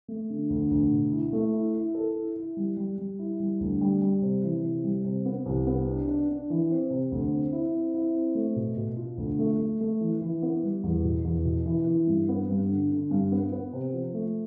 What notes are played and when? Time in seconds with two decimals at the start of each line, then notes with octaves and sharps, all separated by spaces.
0.08 A3
0.30 D3
0.50 D2
0.71 D2
0.91 B2
1.12 E4
1.33 A3
1.54 E4
1.74 E4
1.95 A4
2.16 E4
2.36 E4
2.57 G3
2.77 G3
2.98 G3
3.19 E4
3.40 G3
3.60 D2
3.81 G3
4.02 G3
4.22 C3
4.43 E3
4.64 C3
4.84 G3
5.05 C3
5.25 B3
5.46 C2
5.67 B3
5.88 D4
6.08 D4
6.29 D4
6.50 E3
6.70 C4
6.90 C3
7.12 D2
7.32 C4
7.52 E4
7.74 C4
7.94 E4
8.15 C4
8.35 A3
8.56 B2
8.77 B2
8.97 F4
9.17 D2
9.39 A3
9.59 A3
9.81 A3
10.01 E3
10.21 E3
10.42 B3
10.63 G3
10.83 E2
11.04 B2
11.24 E2
11.45 B2
11.66 E3
11.87 E3
12.07 G2
12.29 B3
12.49 G2
12.69 D3
12.90 D3
13.11 G2
13.32 B3
13.52 B3
13.73 C3
13.93 F3
14.14 A3